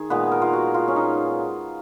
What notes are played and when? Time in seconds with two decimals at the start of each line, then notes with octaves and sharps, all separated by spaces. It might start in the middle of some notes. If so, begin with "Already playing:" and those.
Already playing: D#3 G#4
0.10 A#2 G#3 B3 B4
0.32 A#4
0.42 F4
0.53 F#4
0.74 F4
0.88 C#4
0.96 D#4